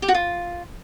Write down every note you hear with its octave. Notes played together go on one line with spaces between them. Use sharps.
G4
F#4
F4